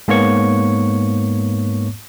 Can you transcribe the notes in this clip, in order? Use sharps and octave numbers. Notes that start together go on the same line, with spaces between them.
G#2 A#3 B3 C#5 C#6